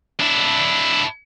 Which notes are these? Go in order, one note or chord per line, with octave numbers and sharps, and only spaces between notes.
D4 E4